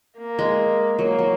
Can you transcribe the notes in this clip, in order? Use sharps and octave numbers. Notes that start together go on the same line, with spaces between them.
A#3
G#3
F#3 A#3
F#3